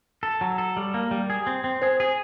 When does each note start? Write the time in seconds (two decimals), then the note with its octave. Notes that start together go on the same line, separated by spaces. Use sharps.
0.23 A4
0.41 F#3
0.58 A4
0.77 G3
0.94 A#3
1.11 G3
1.30 G#4
1.47 C4
1.64 C4
1.82 G#4 C5
2.00 G#4